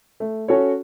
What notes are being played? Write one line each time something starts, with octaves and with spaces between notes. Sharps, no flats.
A3
C#4 F#4 A4 C#5